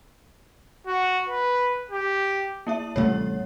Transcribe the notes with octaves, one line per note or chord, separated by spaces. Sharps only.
F#4
B4
G4
A#3 E4 E5
A1 C3 G3 A3 C#5